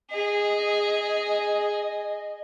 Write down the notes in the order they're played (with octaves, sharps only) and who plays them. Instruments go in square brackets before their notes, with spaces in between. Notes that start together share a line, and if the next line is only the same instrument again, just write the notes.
[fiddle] G#4 [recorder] D#5